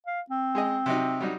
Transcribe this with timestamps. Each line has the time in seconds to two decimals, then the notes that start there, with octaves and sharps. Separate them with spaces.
0.06 F5
0.30 C4
0.55 G#3 G#4 D#5
0.86 C3 F#3 D#4
1.20 F#3 G3 D#4